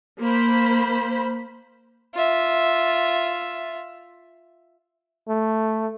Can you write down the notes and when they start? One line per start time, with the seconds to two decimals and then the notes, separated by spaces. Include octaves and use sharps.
0.21 A#3 C5 B5
2.14 F4 E5
5.29 A3